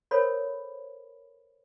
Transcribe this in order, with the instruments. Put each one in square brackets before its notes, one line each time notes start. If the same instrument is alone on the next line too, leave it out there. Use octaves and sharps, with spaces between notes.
[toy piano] A4 A#4 C5 C#5 B5